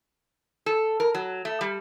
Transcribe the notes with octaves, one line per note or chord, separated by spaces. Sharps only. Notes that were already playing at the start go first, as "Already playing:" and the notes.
A4
A#4
F#3
A3
G3